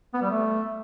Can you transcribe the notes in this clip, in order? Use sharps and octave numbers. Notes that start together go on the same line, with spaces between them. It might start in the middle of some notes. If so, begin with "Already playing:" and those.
B3
G3
A3